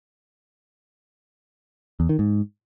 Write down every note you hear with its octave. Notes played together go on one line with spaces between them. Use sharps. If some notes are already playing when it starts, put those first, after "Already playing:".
E2
D#3
G#2